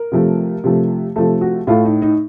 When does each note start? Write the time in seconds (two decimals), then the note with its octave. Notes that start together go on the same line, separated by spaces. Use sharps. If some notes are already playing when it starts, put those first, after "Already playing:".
Already playing: A#4
0.12 C3 F3 A3
0.64 C3 F3 A3
1.16 C3 F3 A3 A4
1.41 F#4
1.67 A2 A3 F4
1.85 D#4
2.02 D#4